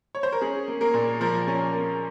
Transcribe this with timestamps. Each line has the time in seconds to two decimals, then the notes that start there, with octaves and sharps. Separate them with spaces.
0.15 C#5
0.23 C5
0.32 A#4
0.41 C#4 G#4
0.68 A#3
0.81 A#3 A#4
0.94 A#2
1.20 F3 A#3 A#4
1.47 C#4
1.73 A#3